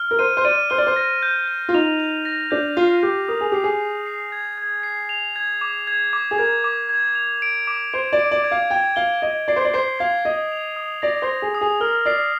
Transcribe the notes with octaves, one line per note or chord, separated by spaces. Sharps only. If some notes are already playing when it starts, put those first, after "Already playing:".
Already playing: F6
A#4
C5 D#7
C5
D5 D#7
C5 F6
D5
C5
A#6
G6
G6
F4
D#4 F7
F7
A#6
D4 G6
F4 C7
G4 G6
A#4 D#6
G#4
G4 C7
G#4
C7
C7
G#6
G#6
C7
F7
G#6
D6
G#6
D6
G#4
A#4 G#6
D6
G#6
F7
D7
D6
C5 D7
D5
D7
D5
G#6
F5
G5 G#6
F5 G7
D#5 G#6
D5 C7
C5
D5
C5 C7
F5 G#6
D#5 D#6
F7
D#6
D5 A#6
C5
A#6
G#4
D#6
G#4
A#4 F6
D5 C7